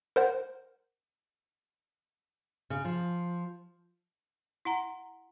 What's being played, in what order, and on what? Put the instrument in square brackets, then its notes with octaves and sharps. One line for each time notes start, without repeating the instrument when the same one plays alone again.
[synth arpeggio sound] A#4 C5 F#5
[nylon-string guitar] C#3
F3
[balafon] E4 F#5 A#5